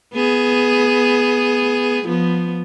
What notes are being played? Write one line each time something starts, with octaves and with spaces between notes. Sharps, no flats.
B3 G#4
F3 B3